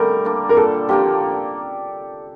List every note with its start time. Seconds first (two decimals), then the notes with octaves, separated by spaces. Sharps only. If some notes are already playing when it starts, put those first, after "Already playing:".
Already playing: D3 G3 A3 A#4
0.25 A#3 D4
0.49 A#4
0.57 A#2 A4
0.89 F3 A#3 D4 G4